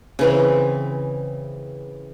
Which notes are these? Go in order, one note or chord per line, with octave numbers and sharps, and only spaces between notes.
C#3 E3 C4